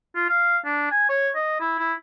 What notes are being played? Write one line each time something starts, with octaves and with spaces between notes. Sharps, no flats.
F4
F5
D4
G#5
C#5
D#5
E4
E4